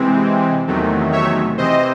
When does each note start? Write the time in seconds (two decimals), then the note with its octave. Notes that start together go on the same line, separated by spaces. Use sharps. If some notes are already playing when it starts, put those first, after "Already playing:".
Already playing: C3 E3 G#3 C4
0.67 E2 C3 D#3 F#3 A3
1.12 C#5 E5
1.58 C3 E3 C4 C5 D#5